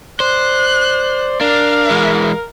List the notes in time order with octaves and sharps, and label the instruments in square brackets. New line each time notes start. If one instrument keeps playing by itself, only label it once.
[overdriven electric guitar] C5 [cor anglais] D5 [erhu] F#6
[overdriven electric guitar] D4 [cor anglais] A#4 [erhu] F5
[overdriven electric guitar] E3 G#3